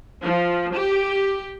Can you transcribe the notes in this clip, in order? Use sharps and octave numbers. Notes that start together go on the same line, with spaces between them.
F3
G4